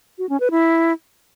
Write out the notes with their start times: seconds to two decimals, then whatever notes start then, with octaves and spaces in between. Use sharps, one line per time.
0.18 F#4
0.29 C#4
0.40 B4
0.51 E4